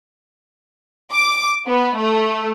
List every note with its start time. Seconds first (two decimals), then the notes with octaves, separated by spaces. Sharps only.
1.12 D6
1.67 B3
1.97 A3